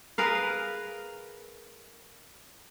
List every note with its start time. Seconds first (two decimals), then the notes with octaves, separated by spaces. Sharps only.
0.18 G#4 A#4 B4 F5